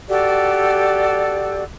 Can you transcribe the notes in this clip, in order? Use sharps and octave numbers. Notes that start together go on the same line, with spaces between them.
F#4 G4 A4 D5